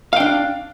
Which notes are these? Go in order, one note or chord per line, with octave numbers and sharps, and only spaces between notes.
D4 F5 G5